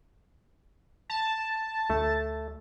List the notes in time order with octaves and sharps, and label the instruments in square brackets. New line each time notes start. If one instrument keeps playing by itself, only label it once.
[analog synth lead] A5
[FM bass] D2 [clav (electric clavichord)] A3